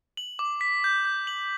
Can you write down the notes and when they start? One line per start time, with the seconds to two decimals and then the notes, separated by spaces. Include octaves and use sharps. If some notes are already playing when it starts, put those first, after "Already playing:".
0.17 F#7
0.39 D6
0.61 B6
0.84 G6
1.05 G6
1.27 F#7